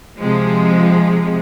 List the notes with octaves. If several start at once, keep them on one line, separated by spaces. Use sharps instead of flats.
C3 F3 G#3